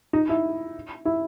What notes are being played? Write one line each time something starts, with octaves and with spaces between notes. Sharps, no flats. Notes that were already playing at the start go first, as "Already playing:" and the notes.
D#4
E4
E4